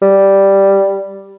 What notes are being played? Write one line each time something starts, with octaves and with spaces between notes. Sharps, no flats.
G3